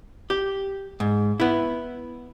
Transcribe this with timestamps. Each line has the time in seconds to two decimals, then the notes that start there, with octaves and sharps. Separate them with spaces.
0.30 G4
1.00 G#2
1.40 B3 E4